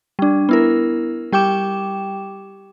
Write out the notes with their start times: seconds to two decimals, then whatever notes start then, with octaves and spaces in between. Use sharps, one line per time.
0.19 G3 D4
0.49 B3 E4 A#4
1.32 G3 G4 G5 D6 E7